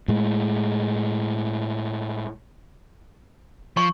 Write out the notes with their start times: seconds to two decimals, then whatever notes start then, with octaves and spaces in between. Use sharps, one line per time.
0.08 A2 G#3
3.77 F3 C#6